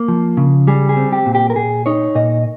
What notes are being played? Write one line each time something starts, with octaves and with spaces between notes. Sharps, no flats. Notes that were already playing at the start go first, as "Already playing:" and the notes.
Already playing: A#3
F3
C#3
G3 G#4
G#4
C4
G4
A#2
G4
A#4
A#2 G#4
D#4 C#5
A#2 D#5